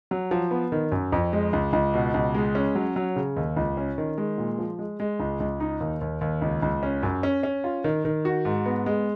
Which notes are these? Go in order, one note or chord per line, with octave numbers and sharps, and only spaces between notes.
F#3
F3
B3
D#3
F#2
F2
G#3
C#2
C#2
B2
C#2
G#3
C#4
F#3
F#3
C#3
D#2
C#2
C#4
D#3
G#3
A#2
F3
G#3
G#3
C#2
C#2
D#4
D#2
D#2
D#2
C#2
C#2
C#4
F#2
C#4
C#4
F4
D#3
D#3
F#4
G#2
B3
G#3